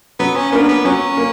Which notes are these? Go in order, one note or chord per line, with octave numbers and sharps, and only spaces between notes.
F#3 B3
C#4
A#3 B3 D4 A#4
B3
F#3 C#4
A#3